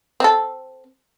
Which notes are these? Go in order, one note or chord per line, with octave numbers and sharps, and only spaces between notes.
C4 A4